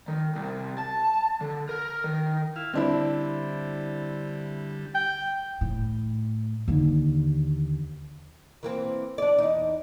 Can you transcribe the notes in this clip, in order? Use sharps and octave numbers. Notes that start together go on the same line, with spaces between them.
D#3
C2
A5
D3
A#4
D#3
E4 F5
D3 G3 C4 D4 E4
G5
A2
D#2 D3
E3 A#3 C4
D4 D5
E2 D#4